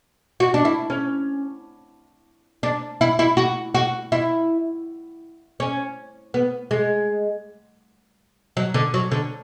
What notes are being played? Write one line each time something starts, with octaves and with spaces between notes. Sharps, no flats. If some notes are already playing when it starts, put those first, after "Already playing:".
F#4
D4
E4
C#4
D4
E4
E4
F#4
F#4
E4
C#4
B3
G#3
F#3
D3
F#3
D3